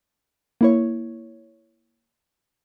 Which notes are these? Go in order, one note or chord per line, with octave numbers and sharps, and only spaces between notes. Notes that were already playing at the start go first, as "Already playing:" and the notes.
A#3 E4 C#5